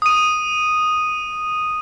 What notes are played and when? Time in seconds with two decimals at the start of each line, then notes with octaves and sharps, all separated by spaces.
0.02 D#6 D#7